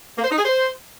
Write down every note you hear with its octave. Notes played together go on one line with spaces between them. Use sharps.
A#3
C5
D#4
G#4
C5